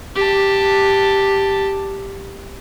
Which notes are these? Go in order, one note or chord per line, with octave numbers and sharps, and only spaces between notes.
G4 A5